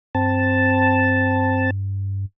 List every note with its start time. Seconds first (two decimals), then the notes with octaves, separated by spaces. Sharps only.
0.15 G2 C4 A5